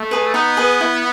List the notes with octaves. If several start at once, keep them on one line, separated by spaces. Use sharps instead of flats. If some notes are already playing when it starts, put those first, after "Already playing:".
Already playing: A3
G#4 B4
B3 D#4
G#4 B4
E4